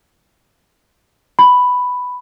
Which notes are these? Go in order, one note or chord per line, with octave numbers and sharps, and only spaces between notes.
B5